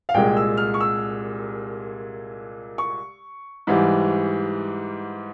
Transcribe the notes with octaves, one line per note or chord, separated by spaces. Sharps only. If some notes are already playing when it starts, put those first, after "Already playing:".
F5
C2 A#2 G#3 G5
E6
F6
C#6
E6
C#6
G#2 E3 G3